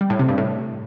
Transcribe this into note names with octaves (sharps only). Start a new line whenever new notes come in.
G3
A2
C3
G2
A2